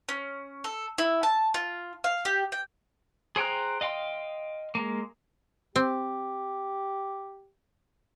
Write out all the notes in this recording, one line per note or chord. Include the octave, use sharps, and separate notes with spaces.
C#4
A4
E4
A5
F4
F5
G4
G5
G#4 C5 G5 A#5 F#6
D#5 F5 G5 C6
G#3 A#3
C4 G4